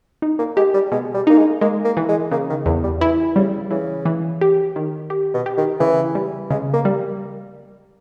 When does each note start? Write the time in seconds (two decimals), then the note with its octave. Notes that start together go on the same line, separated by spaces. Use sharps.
0.22 D#4
0.39 A#3
0.57 G#3 G4
0.74 G3
0.92 B2 G#3
1.14 G3
1.27 A#3 D#4
1.38 G#3
1.61 G#3 A#3
1.85 A#3
1.97 E3
2.09 G#3
2.31 C#3 A#3
2.49 D#3
2.66 E2 E3
2.84 G3
3.01 E3 E4
3.36 C#3 G3
3.71 C#3 E3
4.05 E3
4.41 G4
4.76 D#3
5.10 G4
5.34 B2
5.46 G4
5.57 D#3
5.80 C#3 E3
6.15 G3
6.51 C#3 G#3
6.73 A#3
6.85 G3